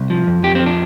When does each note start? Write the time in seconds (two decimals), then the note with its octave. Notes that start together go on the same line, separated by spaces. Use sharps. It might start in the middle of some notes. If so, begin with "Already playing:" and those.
Already playing: C2
0.10 F3
0.27 F2
0.43 F2 G4
0.55 C4
0.60 F3
0.66 D4